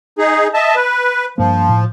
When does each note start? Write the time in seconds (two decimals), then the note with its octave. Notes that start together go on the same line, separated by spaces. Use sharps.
0.18 D#4 G#4
0.54 D#5 E5 A5
0.75 B4
1.38 G2 F3 A#3
1.69 A2